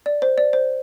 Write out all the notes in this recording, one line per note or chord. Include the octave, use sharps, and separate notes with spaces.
D5
C5
D5
C5